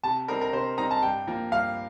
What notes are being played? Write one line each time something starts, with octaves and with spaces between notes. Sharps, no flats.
C3 A5
G3 C4 D#4 A#4
A#4
C3 C5
G3 C4 D#4 A#5
A5
G2 G5
F3 A#3
G2 F5